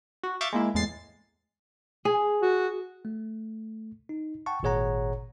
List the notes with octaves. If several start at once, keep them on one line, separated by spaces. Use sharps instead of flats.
F#4
E5 F5 C#6 D6 G6 A6
G#3 A#3 E4
E2 A2 G#3 A6 C7
G#4
F#4
A3
D#4
F#5 G5 A5 C#6
G#1 A#2 G#4 C#5 F#5 A#5